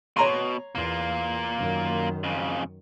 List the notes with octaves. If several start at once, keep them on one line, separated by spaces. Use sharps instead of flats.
B2 C#5 A#5 C6
E2 A#3 F4
F#2 D#3
F2 C#3